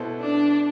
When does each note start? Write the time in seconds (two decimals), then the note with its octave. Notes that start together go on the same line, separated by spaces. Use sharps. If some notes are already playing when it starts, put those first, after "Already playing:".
Already playing: B2 B3 E4 A4 C5
0.20 D4